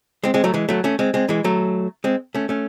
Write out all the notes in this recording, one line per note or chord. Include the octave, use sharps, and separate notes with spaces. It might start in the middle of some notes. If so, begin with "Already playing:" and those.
G#3 C4
G#3 C4
F#3 A3
E3 G#3
F#3 A3
A3 C#4
G#3 C4
G#3 C4
E3 G#3
F#3 A3
G#3 C4
A3 C#4
A3 C#4